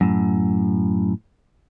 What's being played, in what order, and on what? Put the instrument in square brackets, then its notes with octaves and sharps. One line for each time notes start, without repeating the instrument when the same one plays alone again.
[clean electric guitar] F#2 A2